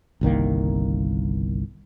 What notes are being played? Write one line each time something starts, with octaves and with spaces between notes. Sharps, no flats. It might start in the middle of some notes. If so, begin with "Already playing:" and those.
G1 C2 D#3 A#3